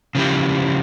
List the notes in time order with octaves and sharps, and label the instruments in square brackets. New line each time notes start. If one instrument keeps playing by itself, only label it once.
[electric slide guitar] C#3 F3 C4 E4 G4